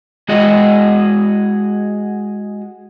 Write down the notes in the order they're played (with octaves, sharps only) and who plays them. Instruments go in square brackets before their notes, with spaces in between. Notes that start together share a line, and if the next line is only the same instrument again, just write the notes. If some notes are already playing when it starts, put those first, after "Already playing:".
[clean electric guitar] G#3 E4 F#4 G#4 D#5